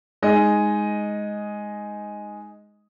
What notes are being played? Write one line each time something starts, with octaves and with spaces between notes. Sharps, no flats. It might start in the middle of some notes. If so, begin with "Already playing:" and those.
G#3 D#4 D#5